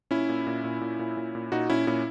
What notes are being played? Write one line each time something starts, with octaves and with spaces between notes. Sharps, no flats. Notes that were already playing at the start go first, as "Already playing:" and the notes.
A#2 C#4 E4
A#2
A#2
A#2
A#2
A#2
A#2
A#2
A#2 D#4 F#4
A#2 C#4 E4
A#2 C#4 E4